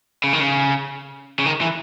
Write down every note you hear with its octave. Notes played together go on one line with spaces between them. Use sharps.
C#3
D#3
C#3
C#3
D#3
E3